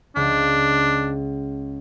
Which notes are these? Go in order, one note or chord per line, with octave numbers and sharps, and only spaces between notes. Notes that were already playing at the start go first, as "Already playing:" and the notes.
C#2 D4